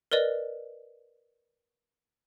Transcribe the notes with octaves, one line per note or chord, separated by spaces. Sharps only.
A#4 B4 D5 D#5